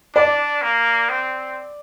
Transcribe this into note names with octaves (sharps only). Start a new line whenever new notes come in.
D4 D5
A#3
C4